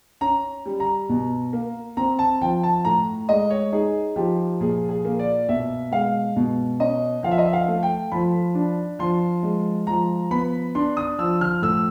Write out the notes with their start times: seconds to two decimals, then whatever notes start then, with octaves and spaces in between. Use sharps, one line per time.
0.21 C#4 A#5
0.66 G3
0.80 A#5
1.09 B2
1.53 A#3
1.97 C4 A#5
2.19 A5
2.41 F3 G5
2.63 A5
2.85 A2 A#5
3.29 G#3 D#5
3.50 C#5
3.72 D#4 G#4
4.16 F3 G4
4.60 A#2 G#4
4.89 G#4
5.05 A#3
5.19 D5
5.49 B2 E5
5.91 G#3 F5
6.36 B2
6.80 C#4 D#5
7.23 F3 F5
7.31 E5
7.38 D#5
7.45 E5
7.53 F5
7.68 A3
7.83 G5
8.12 F3 B5
8.55 D4
8.99 F3 C6
9.43 G#3
9.87 F3 A#5
10.31 B3 B5
10.75 D4 C6
10.97 D#6
11.19 F3 E6
11.41 F6
11.62 A2 E6